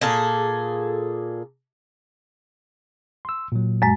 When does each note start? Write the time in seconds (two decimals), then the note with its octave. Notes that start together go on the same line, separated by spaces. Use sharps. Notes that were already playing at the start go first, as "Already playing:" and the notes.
0.01 A#2 G#4 A4
3.25 C6 E6
3.52 A#2 F#3
3.82 F#2 G#3